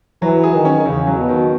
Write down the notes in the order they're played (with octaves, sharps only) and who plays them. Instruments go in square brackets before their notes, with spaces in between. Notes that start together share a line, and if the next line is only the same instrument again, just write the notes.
[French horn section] E3 [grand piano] F#3
[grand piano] G#4
[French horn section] D#3
[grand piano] C#4
[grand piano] E2 [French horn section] C#3
[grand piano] F#3
[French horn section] B2
[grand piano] D#3